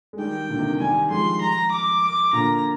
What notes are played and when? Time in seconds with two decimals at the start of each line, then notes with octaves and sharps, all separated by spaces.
0.13 G#3
0.18 D#3 G3 G5
0.49 A#2 D3
0.59 C3 D#3
0.80 D#3 G3 G#5
1.11 F3 G#3 C6
1.41 A#5
1.71 D6
2.02 D6
2.33 A#2 D3 A#5